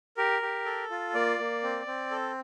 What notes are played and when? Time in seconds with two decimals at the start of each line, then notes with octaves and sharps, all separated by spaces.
0.17 G4 A#4
0.42 G4
0.65 A4
0.90 F4
1.14 A#3 D5
1.39 A#3
1.63 C4
1.86 C4
2.11 A4